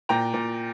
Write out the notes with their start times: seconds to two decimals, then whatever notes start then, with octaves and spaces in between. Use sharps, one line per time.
0.09 A#2 G5 A#5
0.34 A#2